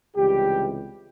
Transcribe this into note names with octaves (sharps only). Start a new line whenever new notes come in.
C#2 C3 E3 G3 G4